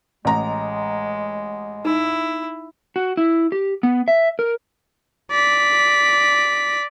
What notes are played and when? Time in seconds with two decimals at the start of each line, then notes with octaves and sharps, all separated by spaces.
0.25 A1 G#3 A#5
1.85 D#4 E4
2.96 F#4
3.17 E4
3.52 G4
3.83 B3
4.08 E5
4.39 A#4
5.31 D5 B6